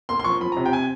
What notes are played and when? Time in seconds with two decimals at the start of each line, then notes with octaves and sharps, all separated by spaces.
0.09 A#3 C6
0.20 C6
0.24 F3 C#6
0.41 F3 B5
0.52 A#5
0.57 C3
0.66 G5
0.73 G#5